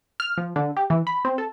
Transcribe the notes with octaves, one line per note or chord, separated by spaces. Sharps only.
F6
F3
D3
G4
E3
B5
C4
A4